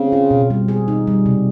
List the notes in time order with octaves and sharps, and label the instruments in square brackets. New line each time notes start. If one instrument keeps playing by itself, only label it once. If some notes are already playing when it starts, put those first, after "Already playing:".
Already playing: [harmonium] C#3 [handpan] C4
[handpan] F4
B2
G3
G#4
D#4
G3
C3